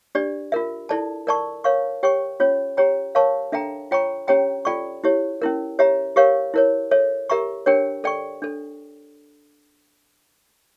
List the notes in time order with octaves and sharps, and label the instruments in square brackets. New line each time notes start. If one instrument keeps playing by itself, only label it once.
[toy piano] D4 G4 D5
F4 A#4 E5
E4 A4 D5 A5
A#4 D5 A5 C#6
A#4 C#5 F5 C#6
G4 C#5 G5 C#6
C#4 F4 C#5
G4 C#5 G5 A#5
A#4 C#5 F5 A5 C#6
D4 A4 E5 G5 A#5
F4 C#5 G5 A#5 C#6
C#4 G4 C#5 G5 A#5
F4 A4 D5 G5 C#6
E4 G4 C#5
C#4 E4 A#4
G4 C#5 E5 A#5
G4 A#4 C#5 F5 C#6
E4 A#4 C#5
A4 C#5 E5
G4 A#4 E5 A#5 C#6
D4 G4 A#4 C#5 G5
A4 D5 G5 C#6
D4 A4